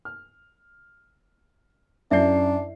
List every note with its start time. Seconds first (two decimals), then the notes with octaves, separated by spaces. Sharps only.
0.05 F6
2.11 F#2 D4 E4 D5 E5 C7